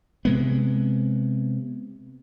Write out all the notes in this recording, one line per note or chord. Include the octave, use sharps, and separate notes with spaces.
C3 G#3 B3